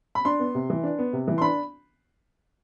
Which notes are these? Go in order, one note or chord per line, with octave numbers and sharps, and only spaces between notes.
B5
D4 C6
B3
C3
E3
D4
B3
C3
E3
C6
D4 B5